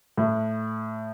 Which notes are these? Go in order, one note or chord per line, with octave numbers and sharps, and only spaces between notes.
A2